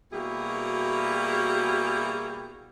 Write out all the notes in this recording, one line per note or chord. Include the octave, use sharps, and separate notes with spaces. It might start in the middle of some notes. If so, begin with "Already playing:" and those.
B2 G3 A#3 E4 F#4 G#4